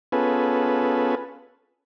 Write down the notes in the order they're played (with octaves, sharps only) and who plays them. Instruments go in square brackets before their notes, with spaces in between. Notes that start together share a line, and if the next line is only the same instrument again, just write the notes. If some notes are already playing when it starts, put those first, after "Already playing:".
[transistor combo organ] B3 C#4 F4 G#4 A4 B4